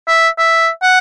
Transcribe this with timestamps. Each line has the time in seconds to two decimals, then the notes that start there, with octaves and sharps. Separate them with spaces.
0.08 E5
0.39 E5
0.83 F#5